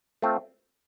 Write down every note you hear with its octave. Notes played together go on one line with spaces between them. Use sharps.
A3 C4 F4